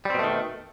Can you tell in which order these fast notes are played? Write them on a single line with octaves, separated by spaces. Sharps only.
G3 C4 B2 A3 D#3